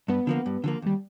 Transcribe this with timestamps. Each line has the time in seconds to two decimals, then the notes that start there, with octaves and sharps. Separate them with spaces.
0.08 G2 B3
0.27 D3 F3 A#3
0.46 G2
0.64 D3 F3 A#3
0.82 D#2 G3